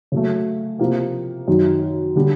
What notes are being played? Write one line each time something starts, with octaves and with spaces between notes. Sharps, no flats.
C#3 F#3 A3
C3 F3 A#3
F#2 D#3 F#3
D3 G3